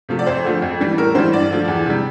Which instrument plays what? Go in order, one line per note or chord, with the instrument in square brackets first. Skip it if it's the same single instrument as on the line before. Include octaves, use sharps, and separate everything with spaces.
[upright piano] C3 F3 A3
D5
F2 C5
D3 F3 A3
F2
E3 G3
A2 A#4
E3 G3 C5
G2 D5
D3 F3 A3
E2
C3 G3